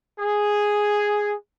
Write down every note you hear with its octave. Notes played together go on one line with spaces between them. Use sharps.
G#4